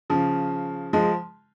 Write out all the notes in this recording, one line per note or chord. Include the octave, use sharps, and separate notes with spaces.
C#3 F3
F3 G#3